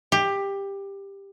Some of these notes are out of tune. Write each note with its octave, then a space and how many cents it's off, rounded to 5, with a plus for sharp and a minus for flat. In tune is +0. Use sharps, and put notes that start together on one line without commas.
G4 +15